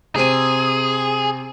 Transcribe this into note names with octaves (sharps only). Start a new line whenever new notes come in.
C3 C4 G#4 D#7